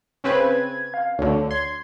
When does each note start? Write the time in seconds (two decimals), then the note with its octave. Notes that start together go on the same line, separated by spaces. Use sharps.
0.24 C#3 C4 B4 G#6
0.94 F5
1.19 D2 D3 C#5
1.51 C6 G#6